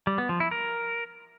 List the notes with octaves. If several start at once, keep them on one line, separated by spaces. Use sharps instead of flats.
G3
B3
F3
E4
A#4